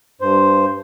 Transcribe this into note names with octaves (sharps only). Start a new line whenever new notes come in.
G2 C5